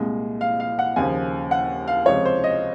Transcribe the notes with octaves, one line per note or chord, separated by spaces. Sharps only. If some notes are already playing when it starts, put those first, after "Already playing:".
Already playing: C2 A#2 G#3
F5
F5
F#5
D#2 C#3 F3 G#5
F#5
F5
C#2 C3 F3 C#5
C5
D#5